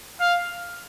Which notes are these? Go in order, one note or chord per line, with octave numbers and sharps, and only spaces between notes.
F5